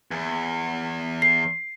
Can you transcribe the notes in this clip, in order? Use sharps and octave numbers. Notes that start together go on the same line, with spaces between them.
E2
C7